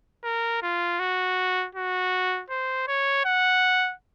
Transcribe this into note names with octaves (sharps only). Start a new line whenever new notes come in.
A#4
F4
F#4
F#4
C5
C#5
F#5